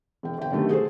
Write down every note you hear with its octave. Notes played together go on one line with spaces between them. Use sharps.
E1 G5
G1 G5
F#2 B2 D3 D#3 G3 A3
F#4 G#4 A4 C5